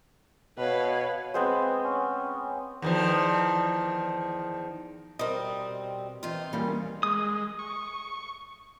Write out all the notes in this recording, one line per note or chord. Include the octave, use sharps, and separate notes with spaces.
B2 B4 C#5 F5
G#3 B3 C4 C5
C#4
E2 D#3 F3
B2 G3 C4 A#4 D#5
D#3 E3 C4 D#4 F4
E2 E3 G3 A#3 C#4
G#3 D#6
C#6